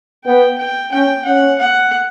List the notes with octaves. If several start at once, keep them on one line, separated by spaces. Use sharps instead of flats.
B3 G5
G5
C#4 G5
C#4 F#5
F#5